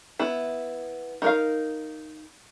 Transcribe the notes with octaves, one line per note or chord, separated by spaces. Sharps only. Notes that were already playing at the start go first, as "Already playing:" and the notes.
B3 E4
D#4 A#4 F5